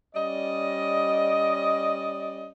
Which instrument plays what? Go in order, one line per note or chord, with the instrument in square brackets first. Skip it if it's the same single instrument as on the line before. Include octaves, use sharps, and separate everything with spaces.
[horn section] G3 C#4 D5 D#5